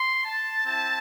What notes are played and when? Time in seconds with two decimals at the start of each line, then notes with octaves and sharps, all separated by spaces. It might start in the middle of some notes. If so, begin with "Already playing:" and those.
Already playing: C6
0.24 A5
0.65 C4 E4 A5